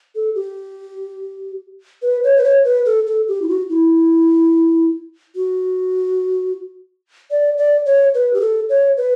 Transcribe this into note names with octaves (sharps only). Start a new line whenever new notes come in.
A4
G4
B4
C#5
B4
C#5
B4
A4
A4
G4
E4
F#4
E4
F#4
D5
D5
C#5
B4
G4
A4
C#5
B4